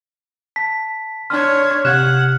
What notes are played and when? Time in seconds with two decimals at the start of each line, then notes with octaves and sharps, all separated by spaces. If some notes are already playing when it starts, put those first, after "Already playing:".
0.56 A5 B6
1.30 D4 C#5 C6 F6
1.85 C3 F#5 F6 F#6 G#6 E7